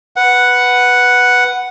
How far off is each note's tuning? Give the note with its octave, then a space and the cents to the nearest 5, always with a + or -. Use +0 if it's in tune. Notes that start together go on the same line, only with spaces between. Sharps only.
B4 +0 F#5 +0